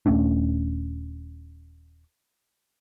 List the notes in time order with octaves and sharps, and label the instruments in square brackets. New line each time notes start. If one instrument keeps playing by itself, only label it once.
[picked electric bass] D#1 A3 C#4 D4